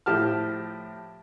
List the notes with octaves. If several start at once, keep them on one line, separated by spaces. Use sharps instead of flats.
A2 F3 G4 A5 F6